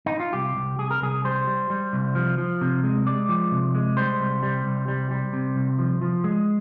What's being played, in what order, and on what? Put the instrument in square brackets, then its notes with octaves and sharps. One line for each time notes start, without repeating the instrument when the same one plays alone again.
[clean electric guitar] D#4
F4
C2 G4
C2
C2 G#4
A#4
C2 G#4
G3 C5
G3
G3
C2
F3
F3
C3
G#3
G#3 D5
F3
C3
G#3
G3 C5
C2
G3
C2
G3
G3
C3
C2
F3
F3
G#3